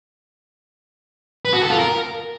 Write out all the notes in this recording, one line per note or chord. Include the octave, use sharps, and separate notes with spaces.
B4
F#4
A4
F4
A#4